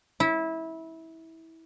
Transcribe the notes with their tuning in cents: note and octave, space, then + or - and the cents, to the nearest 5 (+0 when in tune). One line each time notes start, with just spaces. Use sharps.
E4 -20